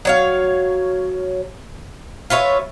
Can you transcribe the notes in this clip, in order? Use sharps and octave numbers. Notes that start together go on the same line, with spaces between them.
F#3 C#5 F5
F4 B4 C#5 E5